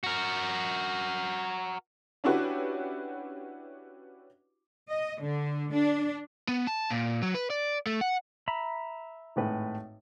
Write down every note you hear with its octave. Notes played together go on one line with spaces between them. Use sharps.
F#4 A#4
C#4 D4 E4 F#4 G4 B4
D#5
D3
D4
B3
A5
A#2
F#3
B4
D5
A3
F#5
E5 A#5 B5
G#1 A2 B4